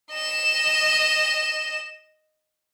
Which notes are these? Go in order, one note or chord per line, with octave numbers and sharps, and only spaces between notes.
D#5 E7